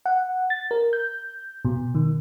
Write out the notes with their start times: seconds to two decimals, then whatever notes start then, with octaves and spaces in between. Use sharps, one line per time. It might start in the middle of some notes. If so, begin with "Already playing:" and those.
0.06 F#5
0.50 A6
0.71 A#4
0.93 G6
1.65 B2
1.95 D#3